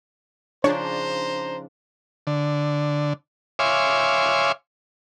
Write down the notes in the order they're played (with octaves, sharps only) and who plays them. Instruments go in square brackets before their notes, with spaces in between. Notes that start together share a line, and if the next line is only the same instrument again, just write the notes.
[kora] C#3 F3 D#4 [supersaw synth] D4 [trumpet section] C5 A#5 [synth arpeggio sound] C#5
[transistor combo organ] D3
C#5 E5 F5 G#5 C6 D6